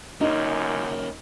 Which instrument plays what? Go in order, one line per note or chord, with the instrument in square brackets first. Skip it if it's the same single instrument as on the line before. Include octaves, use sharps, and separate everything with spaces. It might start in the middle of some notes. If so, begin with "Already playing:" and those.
[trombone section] C#2 F#2 [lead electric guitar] A#3 C#4 [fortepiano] D#4